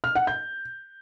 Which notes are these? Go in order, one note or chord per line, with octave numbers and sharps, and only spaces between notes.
F6
F#5
G6